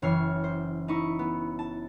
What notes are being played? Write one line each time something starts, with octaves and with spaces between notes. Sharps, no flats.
F#1 E3 C#5 F6 C7
C5
D#4 E4 C#6
B3
A5